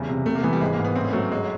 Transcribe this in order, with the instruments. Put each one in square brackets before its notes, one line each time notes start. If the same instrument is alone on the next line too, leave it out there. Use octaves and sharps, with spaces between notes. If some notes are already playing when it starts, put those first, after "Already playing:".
Already playing: [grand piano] E2 C#3 [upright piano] G3
[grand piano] C3
[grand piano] C3 [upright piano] A3
[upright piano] A#3
[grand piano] E3 [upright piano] B3
[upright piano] G3
[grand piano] G#1 [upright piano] G#3
[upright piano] A#3
[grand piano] G#2
[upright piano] B3
[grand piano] A2 [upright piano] C4
[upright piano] C#4
[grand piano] F#3 [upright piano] A3
[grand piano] G1 [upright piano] G#3